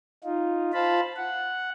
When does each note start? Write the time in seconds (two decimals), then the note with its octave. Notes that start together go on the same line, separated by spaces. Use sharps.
0.24 D#4 F4
0.73 F4 C5 F5 A5 B5
1.17 F#5